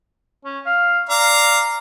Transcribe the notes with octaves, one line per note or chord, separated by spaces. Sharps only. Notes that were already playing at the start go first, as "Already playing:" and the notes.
C#4
F5
D5 F5 A#5